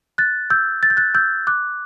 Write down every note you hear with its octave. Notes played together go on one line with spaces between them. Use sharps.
F#6 A6
E6 G6
A6
G6
F#6 A6
E6 G6
D6 F#6